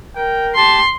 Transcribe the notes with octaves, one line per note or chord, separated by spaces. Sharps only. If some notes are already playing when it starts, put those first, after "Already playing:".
A#4 G5
G4 A5 C6